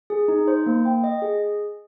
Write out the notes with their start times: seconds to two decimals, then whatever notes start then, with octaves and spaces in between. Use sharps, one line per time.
0.10 G#4
0.28 D#4
0.48 C5
0.66 A#3
0.85 G5
1.04 D#5
1.22 G#4